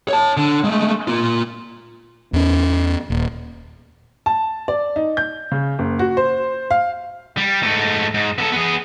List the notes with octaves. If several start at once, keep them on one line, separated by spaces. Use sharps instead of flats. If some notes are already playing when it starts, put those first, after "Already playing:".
C#5 A5
D3
G#3 A3
A#3 F4
E2 C#4
D#1
A5
D5
D#4
G6
C#3
F#1
F#4
C5
F5
G3
G#2 A3
G#2
B3 A4
B3 G#4